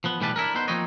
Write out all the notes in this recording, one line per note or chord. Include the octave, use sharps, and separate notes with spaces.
F3 B3
B1 A2 E3 G3 B4 A5
D4 E4 A4 A#4
B3 D#4 B4 C5
F3 A#3 C4 D#4 C#5 D#5